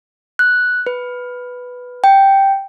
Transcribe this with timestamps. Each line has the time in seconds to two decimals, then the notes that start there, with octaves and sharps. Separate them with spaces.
0.39 F#6
0.87 B4
2.04 G5